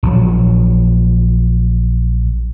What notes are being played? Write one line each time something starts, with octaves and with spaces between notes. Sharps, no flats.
A#1 F#3